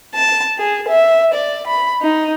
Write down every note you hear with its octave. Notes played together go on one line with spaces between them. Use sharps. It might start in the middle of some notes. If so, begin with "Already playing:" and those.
A5
G#4
E5
D5
B5
D#4